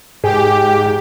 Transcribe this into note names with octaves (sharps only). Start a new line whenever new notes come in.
G#2 G4 G#4